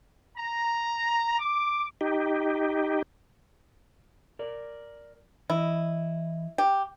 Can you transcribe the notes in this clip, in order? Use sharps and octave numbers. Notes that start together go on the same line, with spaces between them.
A#5
D6
D#4 G4
A#4 D5
E3 E4 D#5
G4